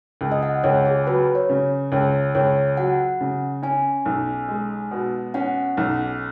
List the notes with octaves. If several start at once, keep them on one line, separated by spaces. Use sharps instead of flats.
C#2
D#5
F#5
C#2 C#5
G#4
F#3 B4
C#5
C#3
C#2 C#5
C#2 C#5
F#3 F#5
C#3
C#4 G#5
B1
G#3
B2
C#4 F#5
B1